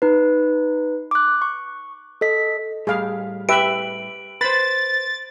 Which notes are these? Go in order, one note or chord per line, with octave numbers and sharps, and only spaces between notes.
D#4 B4
D6 F#6
C#6
A4 D#5 B6
A2 G3 G#4 F5
G4 B4 E5 D7 F#7
B4 C5 B5 A6